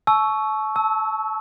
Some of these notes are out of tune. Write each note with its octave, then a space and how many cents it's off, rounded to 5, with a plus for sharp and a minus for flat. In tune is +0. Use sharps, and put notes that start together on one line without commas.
A5 -35 C#6 +5 E6 +0
A5 +0 E6 -20